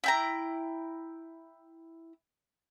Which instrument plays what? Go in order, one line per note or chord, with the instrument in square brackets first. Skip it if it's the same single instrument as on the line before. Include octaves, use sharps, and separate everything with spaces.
[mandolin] E4 G5 A#5